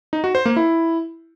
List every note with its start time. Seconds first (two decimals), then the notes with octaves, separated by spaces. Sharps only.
0.13 D#4
0.24 F#4
0.35 C5
0.46 A#3
0.56 E4